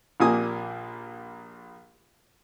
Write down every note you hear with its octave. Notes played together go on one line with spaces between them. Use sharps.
A#1 A#2 A#3 G4 G#5 D#6